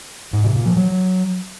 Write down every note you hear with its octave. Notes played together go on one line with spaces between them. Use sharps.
G#2
C3
A#2
F3
F#3